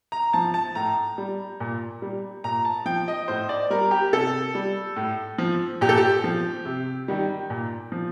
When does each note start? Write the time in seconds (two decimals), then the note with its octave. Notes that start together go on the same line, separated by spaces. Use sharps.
0.12 A#5
0.33 F3 A5
0.54 A5
0.75 A2 A#5
1.18 G3
1.60 A#2
2.02 G3
2.44 A#2 A#5
2.65 A5
2.86 F3 G5
3.08 D#5
3.28 A2 C5
3.49 D5
3.70 G3 A#4
3.91 G4
4.13 C3 A4
4.55 G3
4.96 A2
5.38 F3
5.81 A#2 G4
5.89 A4
5.97 G4
6.24 F3
6.65 C3
7.08 D#3 G3
7.50 A#2
7.92 F3